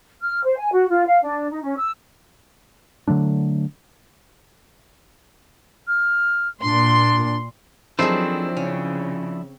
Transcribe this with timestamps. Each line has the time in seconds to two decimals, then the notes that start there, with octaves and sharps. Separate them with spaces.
0.21 F6
0.44 C5
0.57 G#5
0.71 F#4
0.89 F4
1.07 F5
1.23 D4
1.50 D#4
1.62 C#4
1.77 E6
3.08 D3 F#3 A3 D4
5.88 F6
6.63 A#2 D4 C6
7.99 D#3 F3 F#3 A3 C4 D4 E4 G#4
8.57 C#3 C#4